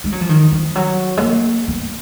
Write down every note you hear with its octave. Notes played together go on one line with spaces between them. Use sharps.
G#3
F#3
F3
D#3
F3
F#3
G#3
A#3
B3